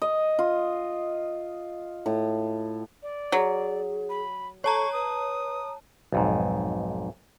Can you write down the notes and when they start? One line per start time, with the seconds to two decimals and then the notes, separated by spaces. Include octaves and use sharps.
0.02 D#5
0.39 F4
2.06 A2
3.03 D5
3.32 F#3 G#4
4.10 B5
4.64 A4 C#5 A5 A#5 C#6
4.93 B4 D#6
6.13 B1 F2 G#2